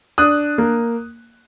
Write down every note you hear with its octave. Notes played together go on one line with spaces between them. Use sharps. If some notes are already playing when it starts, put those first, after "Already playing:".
D4 D#6 F#6
A#3